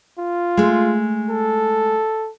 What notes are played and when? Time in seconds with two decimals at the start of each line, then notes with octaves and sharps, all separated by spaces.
0.20 F4
0.57 G#3 A3
1.30 A4